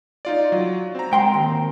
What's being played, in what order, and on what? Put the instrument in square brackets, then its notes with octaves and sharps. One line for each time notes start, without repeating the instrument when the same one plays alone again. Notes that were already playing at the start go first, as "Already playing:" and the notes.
[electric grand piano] D#4 F4 D5
F#3
C4 A#5
[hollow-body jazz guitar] G#2 G5 C6
D#2